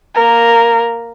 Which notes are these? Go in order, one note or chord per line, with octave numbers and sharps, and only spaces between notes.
A#3 A#4